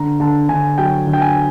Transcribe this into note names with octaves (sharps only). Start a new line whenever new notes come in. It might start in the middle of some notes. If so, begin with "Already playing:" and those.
Already playing: D3 A#5
D3 A5
D3 G#5
F#3 G5
D3
G5
G#5